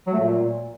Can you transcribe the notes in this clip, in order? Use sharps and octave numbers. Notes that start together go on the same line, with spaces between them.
F#3
A3
A#2